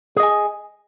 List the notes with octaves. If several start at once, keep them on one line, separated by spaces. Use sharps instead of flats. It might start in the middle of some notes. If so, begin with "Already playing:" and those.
G#4 D#5 G#5